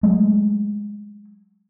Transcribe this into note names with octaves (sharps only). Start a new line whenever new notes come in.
F#3 G#3 A3